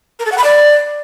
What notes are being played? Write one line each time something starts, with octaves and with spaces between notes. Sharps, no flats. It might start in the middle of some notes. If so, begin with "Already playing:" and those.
A#4
A4
F#5
B5
D5